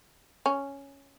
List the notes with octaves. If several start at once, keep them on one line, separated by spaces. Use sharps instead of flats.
C#4